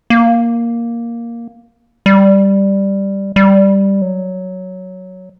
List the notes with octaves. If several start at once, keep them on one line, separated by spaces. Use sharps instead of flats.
A#3
G3
G3
F#3